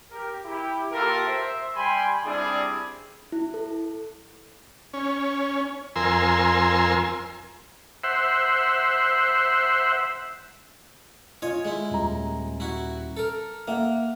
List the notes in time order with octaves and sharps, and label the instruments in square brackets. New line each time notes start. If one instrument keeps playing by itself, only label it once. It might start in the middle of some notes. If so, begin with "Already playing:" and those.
[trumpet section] G4 A#4
E4 G4
A#3 F4 G4 A4 A#4
C5 E5
G3 G5 G#5 B5 C6
G3 C4 D4 E4 G4 G#4
[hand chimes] E4
A4
[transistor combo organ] C#4
F2 A#4 G#5 C6 E6
C5 E5 F#5
[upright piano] F4 [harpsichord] C#5 D#5 G#5
[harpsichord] G#3 E4
[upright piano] D#1 A#5
[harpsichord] E4 F#4
A4 A#4
[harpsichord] A#3 [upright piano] E5 F#5